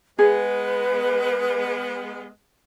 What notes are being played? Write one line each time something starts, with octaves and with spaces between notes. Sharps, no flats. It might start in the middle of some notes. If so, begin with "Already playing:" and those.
G#3 B3 G#4 B4